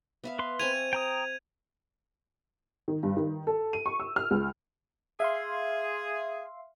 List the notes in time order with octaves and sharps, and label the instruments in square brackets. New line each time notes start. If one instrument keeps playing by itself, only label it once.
[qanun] B3 E5 F5
[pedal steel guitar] B4 C6
[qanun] C4 G#5 C#6 [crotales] G#6 D#7 F7
[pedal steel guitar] G5 A#5 D#6
[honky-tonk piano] D#3
G2
D#3
A4
D#7
C#6
E6
F6
C#2
[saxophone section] G#4 [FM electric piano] E5 F5 C6